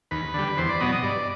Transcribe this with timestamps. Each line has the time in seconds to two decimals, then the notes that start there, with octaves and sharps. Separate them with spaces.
0.11 D#2 B4
0.34 D3 G3
0.57 E2 C5
0.69 D5
0.80 B2 F#3 B3 D#5
0.92 D#5
1.03 G2 D5